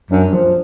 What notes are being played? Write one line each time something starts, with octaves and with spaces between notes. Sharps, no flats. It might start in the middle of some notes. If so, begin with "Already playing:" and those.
F#2 D4
F3